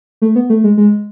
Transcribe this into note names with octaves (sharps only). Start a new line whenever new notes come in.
A3
B3
A3
G#3
G#3